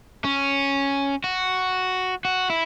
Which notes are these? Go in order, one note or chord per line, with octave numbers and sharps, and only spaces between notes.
C#4
F#4
F#4
E4